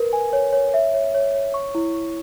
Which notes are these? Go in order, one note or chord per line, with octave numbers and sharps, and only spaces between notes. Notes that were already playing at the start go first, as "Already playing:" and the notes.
Already playing: A#4 B4
G#5
C#5
C#5
E5
C#5
C#5
C#5
C#6
E4
C#6